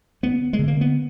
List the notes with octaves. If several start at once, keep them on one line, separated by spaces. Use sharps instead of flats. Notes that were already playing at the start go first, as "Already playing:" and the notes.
D2 B3
G#3
D3
A#3
B3